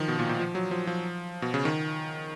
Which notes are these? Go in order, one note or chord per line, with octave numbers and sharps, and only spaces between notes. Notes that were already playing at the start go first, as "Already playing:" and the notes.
Already playing: D#3 F3
B2
A#2
A#2
F3
F#3
F3
F3
B2
C#3
D#3